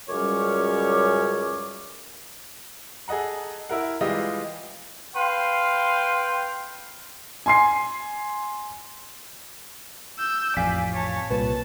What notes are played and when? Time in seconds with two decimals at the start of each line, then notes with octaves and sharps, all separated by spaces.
0.10 C#2 F#2 G3 C#4 C#5 D6
3.08 G#4 A4 D#5 F#5 A#5
3.69 E4 A#4 F#5
4.01 E3 G3 G#3 F4 G4 D#5
5.15 B4 F5 G5 C6
7.46 G#5 C6 C7
10.18 E6 G6
10.57 A1 F2 D5 F5 G#5 B6
10.92 C#5 A5
11.30 C2 A#2 B4 A5